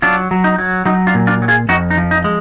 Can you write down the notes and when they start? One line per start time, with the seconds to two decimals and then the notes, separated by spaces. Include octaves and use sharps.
0.02 F#3 D4 F4
0.31 F#3
0.44 D#4
0.58 F#3
0.86 F#3 D#4
1.07 D4 F4
1.14 A#2
1.27 D4 F4
1.42 F#3
1.48 F4 G#4
1.69 F2 D#4 F#4
1.90 D#4
1.97 F3
2.11 D#4
2.24 G#3